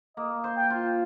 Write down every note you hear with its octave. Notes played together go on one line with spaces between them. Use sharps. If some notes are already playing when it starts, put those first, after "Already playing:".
A#3 D#5
C5
G5
F4